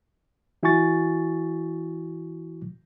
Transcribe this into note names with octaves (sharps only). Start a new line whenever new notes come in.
E3 E4 F#4 G#5 C#6 A6